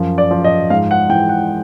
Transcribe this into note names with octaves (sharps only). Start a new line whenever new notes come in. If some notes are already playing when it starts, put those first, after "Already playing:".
Already playing: F#2 F3
D5
F3
D#5
G#2 F5
F#5
E3 G5
F#5